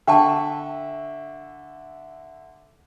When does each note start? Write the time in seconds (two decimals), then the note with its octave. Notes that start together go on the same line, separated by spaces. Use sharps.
0.07 D3 E5 G5 A5 C#6